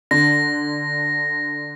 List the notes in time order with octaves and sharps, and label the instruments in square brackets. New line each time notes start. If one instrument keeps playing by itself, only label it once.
[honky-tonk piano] D3 [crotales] A#6